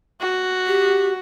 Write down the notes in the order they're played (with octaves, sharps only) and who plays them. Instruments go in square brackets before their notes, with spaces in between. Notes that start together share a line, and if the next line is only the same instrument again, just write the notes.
[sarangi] F#4
[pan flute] G4